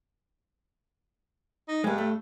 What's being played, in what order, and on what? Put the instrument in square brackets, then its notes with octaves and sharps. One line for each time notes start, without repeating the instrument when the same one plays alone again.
[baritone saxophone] D#4
[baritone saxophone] G2 [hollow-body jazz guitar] G#3 A#3
[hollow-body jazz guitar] A3